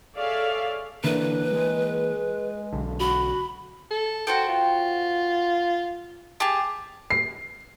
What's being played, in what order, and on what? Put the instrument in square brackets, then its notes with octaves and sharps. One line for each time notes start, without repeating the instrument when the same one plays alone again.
[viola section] G#4 A4 C#5 D5 E5 F5
[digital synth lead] D3 [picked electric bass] E3 A#3 [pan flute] B4
[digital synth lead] G#3
[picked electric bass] B1 D3
[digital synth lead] F#4 [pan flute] B5
[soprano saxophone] A4
[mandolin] F#4 C5 G5 [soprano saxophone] A4
[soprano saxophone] F4
[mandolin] G4 G#4 [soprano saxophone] A5
[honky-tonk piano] C7